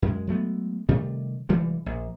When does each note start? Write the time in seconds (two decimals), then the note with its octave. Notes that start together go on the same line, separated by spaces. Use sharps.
0.02 F#2 G#3
0.27 F#3 G#3 A3 B3
0.89 C3 D#3 G3 A3
1.49 F1 E3 G3 G#3
1.86 A#1